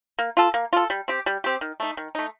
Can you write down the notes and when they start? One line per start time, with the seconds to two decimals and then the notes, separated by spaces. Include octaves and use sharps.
0.19 A#3
0.37 F4 A4
0.54 A#3
0.73 F4 A4
0.90 G3
1.08 C4 G4
1.26 G3
1.44 C4 G4
1.61 D#3
1.80 A3 D#4
1.97 D#3
2.15 A3 D#4